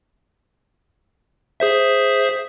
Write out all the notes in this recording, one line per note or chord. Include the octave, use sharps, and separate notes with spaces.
G#4 C5 E5